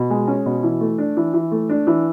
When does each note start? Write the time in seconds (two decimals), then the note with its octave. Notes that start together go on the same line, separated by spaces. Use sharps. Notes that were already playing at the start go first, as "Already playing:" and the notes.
Already playing: B2
0.10 G#3
0.28 C#4
0.46 B2
0.63 E3
0.81 A3
0.98 D4
1.17 E3
1.34 E3
1.52 A3
1.69 D4
1.87 E3